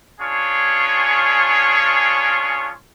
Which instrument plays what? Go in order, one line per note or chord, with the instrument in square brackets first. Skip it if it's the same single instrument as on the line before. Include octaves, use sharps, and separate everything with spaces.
[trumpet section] C#4 D4 F4 G#4 C#5